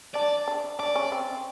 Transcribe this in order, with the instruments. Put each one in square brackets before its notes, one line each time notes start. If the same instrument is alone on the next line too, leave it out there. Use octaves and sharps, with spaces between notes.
[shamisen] D4 [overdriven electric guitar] D5
[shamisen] D4
[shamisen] D4 [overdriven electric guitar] D5
[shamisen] C#4
C4